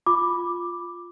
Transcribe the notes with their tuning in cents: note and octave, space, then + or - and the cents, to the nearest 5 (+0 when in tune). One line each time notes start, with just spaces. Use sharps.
F4 +0 B5 +0 D6 +0